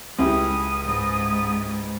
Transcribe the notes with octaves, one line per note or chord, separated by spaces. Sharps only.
C#2 E4 G4 D#6
G#2